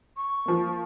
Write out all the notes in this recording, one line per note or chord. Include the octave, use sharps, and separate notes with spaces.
C#6
F3 A#3